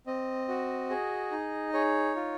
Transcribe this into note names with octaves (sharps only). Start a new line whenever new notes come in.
C4 D#5
F#4
G#4
D#4
G#4 C#5
F4